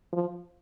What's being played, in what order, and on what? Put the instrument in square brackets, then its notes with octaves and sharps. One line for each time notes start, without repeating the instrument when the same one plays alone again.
[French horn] F3